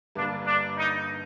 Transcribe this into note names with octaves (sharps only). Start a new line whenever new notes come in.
G1 G2 D3 G3 A#3 D4
D4
D#4